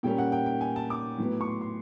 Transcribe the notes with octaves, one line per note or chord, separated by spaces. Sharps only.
A#2 G3 A#3 C#4 G5
F#5
G5
G5
G#5
A5
D6
A2 F#3 B3
C#6
C6
C6